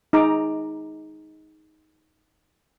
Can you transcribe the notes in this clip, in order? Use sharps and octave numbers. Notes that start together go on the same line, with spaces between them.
D#4 G#4 A#5 D6